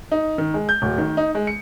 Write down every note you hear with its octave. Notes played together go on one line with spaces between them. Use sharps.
D#4
D#3
G#3
G6
D1
D#3
D#4
G#3
C#7